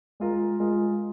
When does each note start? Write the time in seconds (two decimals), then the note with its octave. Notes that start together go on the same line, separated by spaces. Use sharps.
0.20 G#3 F4 A#4
0.60 G#3 F4 A#4